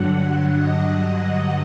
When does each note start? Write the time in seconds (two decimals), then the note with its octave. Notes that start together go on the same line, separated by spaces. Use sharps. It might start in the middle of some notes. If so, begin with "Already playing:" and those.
Already playing: G2 D3 F#3 F#5
0.24 F#5
0.55 D#5
0.86 F#5
1.17 F#5